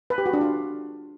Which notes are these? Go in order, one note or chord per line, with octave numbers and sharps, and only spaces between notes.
B4
G4
F#4
D4
F4